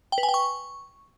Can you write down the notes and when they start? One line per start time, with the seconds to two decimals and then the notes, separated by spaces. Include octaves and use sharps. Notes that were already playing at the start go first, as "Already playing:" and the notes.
0.12 G5
0.18 B4
0.23 G#5
0.29 G5
0.34 C#6